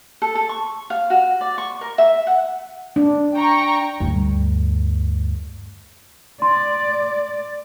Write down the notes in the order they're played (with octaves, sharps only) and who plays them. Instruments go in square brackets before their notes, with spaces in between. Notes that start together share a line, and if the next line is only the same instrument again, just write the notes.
[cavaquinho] A4
A4
C#6
F5
F#4
D5
C#6
A#4
E5
F#5
[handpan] D4
[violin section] G5 A#5 C#6
[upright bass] D2 G2
[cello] D5 [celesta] C6